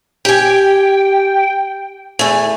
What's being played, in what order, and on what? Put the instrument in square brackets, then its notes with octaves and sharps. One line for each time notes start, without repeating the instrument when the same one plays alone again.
[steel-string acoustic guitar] G4 G#5 [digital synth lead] G5
[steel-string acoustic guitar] E2 A3 [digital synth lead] G#5